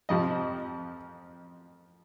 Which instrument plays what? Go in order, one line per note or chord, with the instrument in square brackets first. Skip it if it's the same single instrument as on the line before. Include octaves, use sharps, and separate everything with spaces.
[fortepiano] F2 C3 F3 D#5